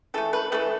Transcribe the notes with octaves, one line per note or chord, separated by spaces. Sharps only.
E3 A3 A4
B4
E3 A3 A4